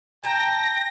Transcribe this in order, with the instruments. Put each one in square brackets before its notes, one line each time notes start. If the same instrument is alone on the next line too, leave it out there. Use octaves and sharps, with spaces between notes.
[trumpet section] G5 [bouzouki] A5 A#5 [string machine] A#6